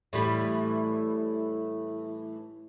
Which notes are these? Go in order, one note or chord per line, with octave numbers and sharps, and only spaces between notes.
A2 E3 G3